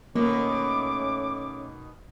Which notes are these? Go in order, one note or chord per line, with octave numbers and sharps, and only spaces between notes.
B2 D#3 A3 A#3 C#4 D6